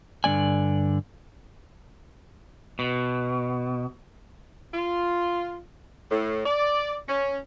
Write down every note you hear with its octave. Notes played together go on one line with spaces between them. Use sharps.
G2 D3 G#3 D5 G#5
B2
F4
A2
D5
C#4